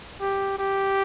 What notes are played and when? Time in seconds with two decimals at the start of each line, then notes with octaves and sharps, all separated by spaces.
0.21 G4
0.59 G4